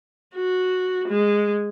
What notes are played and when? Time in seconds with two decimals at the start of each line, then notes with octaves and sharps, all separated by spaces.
0.35 F#4
1.08 G#3